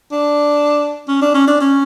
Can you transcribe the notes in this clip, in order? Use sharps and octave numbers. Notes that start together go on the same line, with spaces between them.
D4
C#4
D4
C#4
D4
C#4